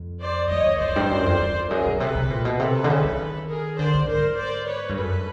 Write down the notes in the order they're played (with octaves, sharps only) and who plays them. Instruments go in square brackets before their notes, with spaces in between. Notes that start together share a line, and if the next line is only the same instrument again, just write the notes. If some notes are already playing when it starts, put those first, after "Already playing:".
Already playing: [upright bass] F2
[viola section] C5 D5
[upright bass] F2 [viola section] C#5 D#5
[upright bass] F2
[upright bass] F2 [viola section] C5 D5
[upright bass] G2
F#2
F2
F2
[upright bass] F#2 [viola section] G#4 A#4
[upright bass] B2
[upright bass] C3 [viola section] A4 B4
[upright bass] C3
A#2
B2
[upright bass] C3 [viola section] A4 B4
[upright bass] D3
C#3
D#3
[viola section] G#4 A#4
[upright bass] D3 [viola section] C5 D5
[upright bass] D3
[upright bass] G#2 [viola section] A#4 C5
[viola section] C5 D5
B4 C#5
[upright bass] G2
[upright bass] F#2 [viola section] A4 B4